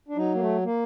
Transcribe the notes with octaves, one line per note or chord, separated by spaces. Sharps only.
D4
F#3 D#4
A#3
A3
A#3